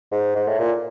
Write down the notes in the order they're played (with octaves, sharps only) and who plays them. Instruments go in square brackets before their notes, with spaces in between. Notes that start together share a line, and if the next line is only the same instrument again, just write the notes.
[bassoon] G#2
G#2
A2
A#2